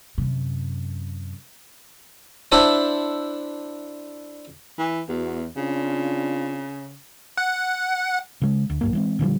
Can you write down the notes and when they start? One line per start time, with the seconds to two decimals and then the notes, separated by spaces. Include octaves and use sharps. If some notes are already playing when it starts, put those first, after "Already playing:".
0.18 F#2 C3
2.52 D4 E4 C5 E5 F#5 A5
4.78 E3
5.08 E2 B3 F#4
5.57 C#3 C4 D4 F4
7.38 F#5
8.42 C#3 G#3
8.70 D2
8.81 B1 G2 A#3
8.93 E3 G#3 C4
9.19 A#2 D3 F3 G3